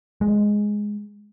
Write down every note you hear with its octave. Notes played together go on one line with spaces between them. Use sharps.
G#3